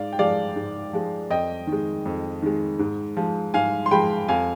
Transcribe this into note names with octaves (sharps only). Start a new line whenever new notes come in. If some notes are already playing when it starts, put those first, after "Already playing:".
Already playing: G#2 D5 F5
G5
F3 G#3 D5 F5
G#2
F3 G#3
F2 D#5 G5
D#3
G#3
F2
D#3 G#3
G#2
F3 G#3
G#2 F5 G#5
C6
F3 G#3 G5 B5
F2 F5 G#5